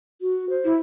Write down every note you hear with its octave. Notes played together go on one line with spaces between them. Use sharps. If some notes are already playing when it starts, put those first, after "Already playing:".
F#4
C5
E4